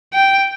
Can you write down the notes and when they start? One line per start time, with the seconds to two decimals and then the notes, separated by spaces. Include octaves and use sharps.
0.14 G5